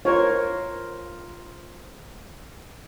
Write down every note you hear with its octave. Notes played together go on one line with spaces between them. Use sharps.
F4 A#4 C5 C#5